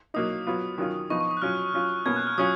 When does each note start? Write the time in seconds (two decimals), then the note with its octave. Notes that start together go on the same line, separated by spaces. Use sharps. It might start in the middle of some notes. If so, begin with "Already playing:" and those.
0.14 F#3 A#3 D#4 D#6
0.47 F#3 B3 F4
0.78 D#3 F#3 C#4 F4
1.10 F3 B3 D#4 C#6
1.21 C#6
1.31 D#6
1.37 F#6
1.42 F#3 C#4 F4 F6
1.74 F#3 C#4 F4
2.06 B2 A#3 C#4 G#6
2.16 F#6
2.27 F6
2.38 F#3 C#4 F4 D#6